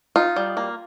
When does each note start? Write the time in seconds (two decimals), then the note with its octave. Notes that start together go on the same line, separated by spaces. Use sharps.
0.16 D#4 F4
0.36 G3
0.57 A#3